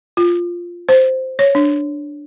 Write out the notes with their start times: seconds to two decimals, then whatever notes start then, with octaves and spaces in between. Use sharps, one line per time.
0.17 F4
0.89 C5
1.39 C#5
1.55 D4